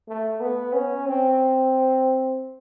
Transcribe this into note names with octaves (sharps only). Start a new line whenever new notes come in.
A3
B3
C#4
C4